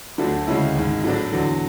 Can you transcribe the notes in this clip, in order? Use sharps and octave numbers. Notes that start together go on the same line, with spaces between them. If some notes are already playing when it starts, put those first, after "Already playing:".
D2 D3 F#3 A3 D4
D2 C#3 G#3 C#4 E4
G#1 G#2 G#3
A2 F#3 A3 D4
E2 D3 F#3